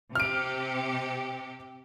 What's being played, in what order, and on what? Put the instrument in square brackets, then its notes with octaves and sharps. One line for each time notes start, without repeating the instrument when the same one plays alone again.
[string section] C3 G4 [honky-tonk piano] F6 D7